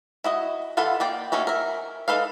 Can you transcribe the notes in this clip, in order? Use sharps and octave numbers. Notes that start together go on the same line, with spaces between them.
E4 F#4 D#5
E3 F4 A4 F#5 B5
A#3 D5 G5
D#3 A3 C#4 F#4
A#4 E5
D#4 E4 A4 B4 F5